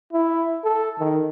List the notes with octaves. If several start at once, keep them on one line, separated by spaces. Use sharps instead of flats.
E4
A4
D#3